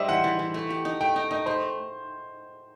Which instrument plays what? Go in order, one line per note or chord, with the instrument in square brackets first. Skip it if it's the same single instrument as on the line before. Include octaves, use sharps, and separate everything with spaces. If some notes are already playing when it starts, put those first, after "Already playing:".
Already playing: [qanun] G3 [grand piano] C5 D#5 E5
[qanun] E3 [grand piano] F#5
[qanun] E3
E3
A3
G4
D#4
[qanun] A3 [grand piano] G5
[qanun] D#4
[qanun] D#4 [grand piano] D#5
[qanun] A3 [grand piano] C5